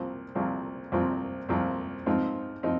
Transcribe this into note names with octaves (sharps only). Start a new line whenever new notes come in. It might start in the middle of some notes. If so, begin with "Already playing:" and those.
Already playing: C2 A#2 F3 C4
C2 A#2 F3 C4
C2 A#2 F3 C4
C2 A#2 F3 C4
G#2 F3 C4 D#4
F3 C4 D#4